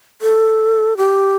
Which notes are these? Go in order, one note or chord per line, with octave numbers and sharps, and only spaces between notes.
A4
G4